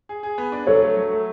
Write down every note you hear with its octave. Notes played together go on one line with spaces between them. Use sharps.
G#4
G#4
B3
D4
F#3 A4 C#5
A3
F#3
A3